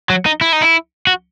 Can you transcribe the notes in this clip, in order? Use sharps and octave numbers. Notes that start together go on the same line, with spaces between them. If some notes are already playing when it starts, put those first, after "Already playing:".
F#3
D#4
E4
D#4
E4
F#4